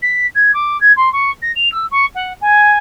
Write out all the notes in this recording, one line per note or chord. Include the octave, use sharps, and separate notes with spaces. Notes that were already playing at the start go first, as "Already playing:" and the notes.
B6
G#6
D6
G#6
C6
C#6
A#6
F7
E6
C#6
F#5
G#5